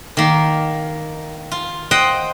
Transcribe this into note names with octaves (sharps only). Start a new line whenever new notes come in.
D#3 A#3
F4
C5 D#5 F#5 G5